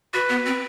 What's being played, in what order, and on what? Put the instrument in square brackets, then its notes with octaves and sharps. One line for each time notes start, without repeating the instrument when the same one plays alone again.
[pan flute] F#4 [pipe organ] B4
[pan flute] B3
C4